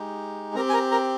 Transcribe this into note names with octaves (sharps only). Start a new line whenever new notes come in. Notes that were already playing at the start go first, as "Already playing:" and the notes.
Already playing: G#3 D#4 G4
C4 G4 A#4 A#5
G#5
A#4 A#5
A#4 A#5